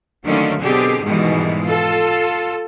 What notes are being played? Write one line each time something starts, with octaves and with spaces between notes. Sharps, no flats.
D3 D#3 F#3 A3 A#3 C#4
B2 D3 C4 G4 G#4
G#2 B2 D#3 E3 G3 G#3
F4 A4